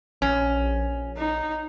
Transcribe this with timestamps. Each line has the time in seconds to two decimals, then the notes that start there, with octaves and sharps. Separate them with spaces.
0.22 A#1 C#4
1.17 D#4